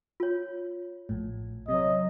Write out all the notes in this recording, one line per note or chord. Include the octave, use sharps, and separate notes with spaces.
F4 C#5
A#1 A2
C3 F#3 D#5